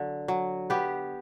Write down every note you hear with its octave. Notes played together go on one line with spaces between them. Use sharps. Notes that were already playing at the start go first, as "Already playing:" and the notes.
Already playing: D3 F#3 C#5
F#3
B3 G4 B4